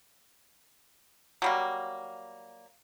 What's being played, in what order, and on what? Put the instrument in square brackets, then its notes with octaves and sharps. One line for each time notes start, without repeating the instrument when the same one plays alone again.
[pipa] F#3 G3 A#3